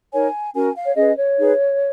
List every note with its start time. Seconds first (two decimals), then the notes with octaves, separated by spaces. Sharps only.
0.13 D#4 A#4 C#5 G#5
0.54 C#4 F#4 A#4 G#5
0.76 F5
0.86 C#5
0.96 C#4 G#4 B4 D#5
1.16 C#5
1.37 D#4 G#4 B4